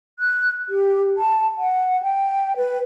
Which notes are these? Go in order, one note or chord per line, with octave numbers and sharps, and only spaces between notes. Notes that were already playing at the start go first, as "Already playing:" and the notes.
F#6
G4
A5
F#5
G5
B4